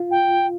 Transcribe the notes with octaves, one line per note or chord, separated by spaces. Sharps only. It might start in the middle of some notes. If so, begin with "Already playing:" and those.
Already playing: F4
G5